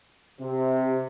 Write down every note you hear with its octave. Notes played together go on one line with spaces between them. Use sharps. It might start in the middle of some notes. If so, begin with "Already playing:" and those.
C3